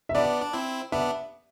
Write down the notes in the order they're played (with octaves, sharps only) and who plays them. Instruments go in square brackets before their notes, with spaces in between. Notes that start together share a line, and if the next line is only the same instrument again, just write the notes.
[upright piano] E5
[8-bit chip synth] B3 D4 [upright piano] D5
[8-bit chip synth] D4
C4 E4
[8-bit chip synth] B3 D4 [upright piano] E5